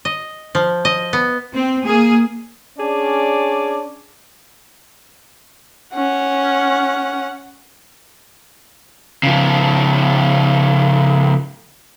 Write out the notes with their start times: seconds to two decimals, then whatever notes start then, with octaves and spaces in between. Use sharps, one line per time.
0.05 D#5
0.55 F3
0.85 D#5
1.13 B3
1.53 C4
1.84 A#3 G#4
2.78 C#4 D4 G#4 D5
5.94 C#4 F#5
9.23 C#3 F3